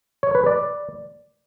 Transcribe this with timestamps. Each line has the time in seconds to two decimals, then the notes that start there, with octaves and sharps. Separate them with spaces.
0.23 C#5
0.35 B4
0.46 D5